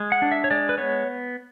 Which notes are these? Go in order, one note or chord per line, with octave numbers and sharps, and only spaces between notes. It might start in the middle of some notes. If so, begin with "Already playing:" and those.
Already playing: G#3
F#5
D4
E5
C#5
G#3 D5
B4
B3 C#5